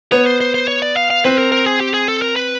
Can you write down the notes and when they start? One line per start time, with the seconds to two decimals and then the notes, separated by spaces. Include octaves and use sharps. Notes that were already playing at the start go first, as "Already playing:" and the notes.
0.12 B3 C#5
0.26 C5
0.41 C5
0.54 C5
0.68 C#5
0.82 D5
0.97 F5
1.10 F5
1.24 C4 B4
1.38 A#4
1.52 A#4
1.66 G#4
1.80 G4
1.94 G#4
2.08 A4
2.22 A#4
2.36 B4